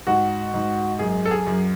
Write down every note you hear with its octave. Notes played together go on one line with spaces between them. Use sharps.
G#2 F#4
G#2
F#2 G#4
A4
G#4
F#2